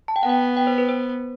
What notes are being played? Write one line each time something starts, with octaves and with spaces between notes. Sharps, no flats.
A5
G5
B3 F#5
G5
G5
C5
B4
C5